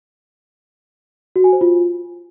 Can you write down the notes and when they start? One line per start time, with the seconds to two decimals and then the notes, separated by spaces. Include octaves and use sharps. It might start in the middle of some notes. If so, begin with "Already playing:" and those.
1.36 F#4
1.44 G#5
1.53 C5
1.61 F4